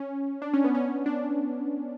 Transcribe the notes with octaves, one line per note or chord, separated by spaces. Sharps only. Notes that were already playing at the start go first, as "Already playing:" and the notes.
Already playing: C#4
D4
C#4
B3
C#4
D4